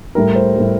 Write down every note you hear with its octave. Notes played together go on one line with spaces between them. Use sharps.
A2 G3 A#4
C5
A2 G3